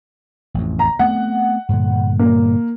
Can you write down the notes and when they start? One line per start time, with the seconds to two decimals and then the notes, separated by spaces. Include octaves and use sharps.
0.54 A1 F2
0.79 A#5
0.99 A3 B3 C4 F#5
1.69 G2 A#2 D3
2.19 A#3